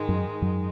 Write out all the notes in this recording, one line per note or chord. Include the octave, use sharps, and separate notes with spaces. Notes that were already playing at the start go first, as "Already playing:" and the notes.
Already playing: G#2 D#3 G#3 D#4
F#2 F#3
F#2 F#3